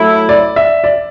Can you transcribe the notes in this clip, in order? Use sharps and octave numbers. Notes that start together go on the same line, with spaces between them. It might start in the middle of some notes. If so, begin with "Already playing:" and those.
Already playing: F#3 A3 E4
D5
E5
D5